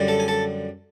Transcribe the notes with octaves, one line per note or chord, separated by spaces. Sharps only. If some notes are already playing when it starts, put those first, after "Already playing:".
Already playing: F#2 D3 G3
A4 A5
G#5
A4 A5